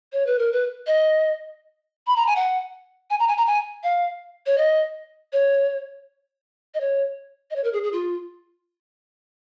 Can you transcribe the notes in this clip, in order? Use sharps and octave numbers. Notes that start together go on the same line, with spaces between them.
C#5
B4
A#4
B4
D#5
B5
A#5
G#5
F#5
G#5
A#5
G#5
A#5
G#5
F5
C#5
D#5
C#5
D#5
C#5
D#5
C#5
A#4
G#4
G#4
F4